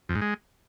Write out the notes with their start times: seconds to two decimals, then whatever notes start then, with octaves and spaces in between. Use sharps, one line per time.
0.09 F2
0.15 G#2
0.21 G#3